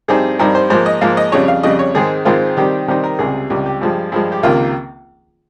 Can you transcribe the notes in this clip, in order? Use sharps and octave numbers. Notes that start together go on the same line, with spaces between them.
G2 G3 C4 D#4 G#4
G2 G3 C4 D#4 A#4
C5
G#2 F3 A#3 C5
D#5
G#2 F3 A#3 F5
D#5
F2 C#3 G3 C#5
F5
F2 C#3 G3 D#5
C#5
G#2 D#3 G#3 C4 G#4
G#2 D#3 G#3 C4 F4
C3 D#3 G3 C4 D#4 G4
C3 D#3 G3 C4 D#4 G4
A#4
C#2 C3 G3 G#4
C#2 C3 G3 G4
G4
G2 F3 G#3
G2 F3 G#3
G4
C#2 C3 D#3 A#3 F4